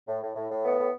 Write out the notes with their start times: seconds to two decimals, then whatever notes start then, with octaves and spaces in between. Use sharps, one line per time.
0.08 A2
0.22 A2
0.36 A2
0.51 A2
0.65 B3
0.79 A2